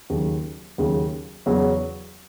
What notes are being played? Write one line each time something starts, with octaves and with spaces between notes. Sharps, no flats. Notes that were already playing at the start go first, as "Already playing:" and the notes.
D#2 C#3 F#3
D#2 C#3 F#3
E2 C#3 F#3 C#4